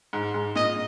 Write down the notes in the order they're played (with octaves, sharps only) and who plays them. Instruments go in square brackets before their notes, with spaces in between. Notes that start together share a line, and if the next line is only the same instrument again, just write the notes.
[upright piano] G#2
G#2
[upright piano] A#2 [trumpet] D#5